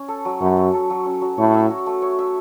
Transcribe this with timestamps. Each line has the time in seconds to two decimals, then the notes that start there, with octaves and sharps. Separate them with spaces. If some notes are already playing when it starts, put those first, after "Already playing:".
Already playing: C#4
0.08 A4
0.25 F#3
0.41 F#2 C#4
0.57 F#3
0.74 A4
0.90 F#3
1.06 C#4
1.21 F#3
1.37 A2 C#5
1.54 E5
1.70 F#4
1.86 A3
2.02 C#5
2.19 E5